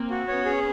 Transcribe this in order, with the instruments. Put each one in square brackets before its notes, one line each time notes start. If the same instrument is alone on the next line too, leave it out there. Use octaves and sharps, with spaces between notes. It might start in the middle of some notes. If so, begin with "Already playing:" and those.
Already playing: [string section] A#3 C4
[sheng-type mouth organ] F#4
[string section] B3 C#4 [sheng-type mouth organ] C#5
[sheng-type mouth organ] G#4